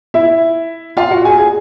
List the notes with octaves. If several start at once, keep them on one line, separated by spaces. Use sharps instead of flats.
E4 E5
F4 F5
F#4 F#5
G#4 G#5
G#4 G#5